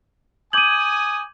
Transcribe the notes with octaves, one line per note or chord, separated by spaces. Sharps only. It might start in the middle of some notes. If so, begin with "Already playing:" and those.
G#5 D6 D#6 G6 G#6 D#7 F#7